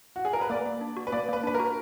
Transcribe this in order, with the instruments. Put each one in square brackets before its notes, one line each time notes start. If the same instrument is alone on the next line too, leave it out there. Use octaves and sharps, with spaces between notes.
[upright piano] F#4
G#4
A#4
B4
[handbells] A#3 [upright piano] D5
[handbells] A#3
D4
F#4
[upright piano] B4
[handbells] A#3 [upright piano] D5
[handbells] A#3 [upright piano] B4
[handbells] D4 [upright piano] B4
[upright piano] A#4
[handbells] F#4